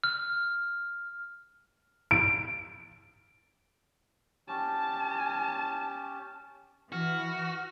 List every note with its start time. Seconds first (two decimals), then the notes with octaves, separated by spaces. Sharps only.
0.04 F6
2.11 D7
4.48 C#4 G4 A5
6.92 E3 F#4 F6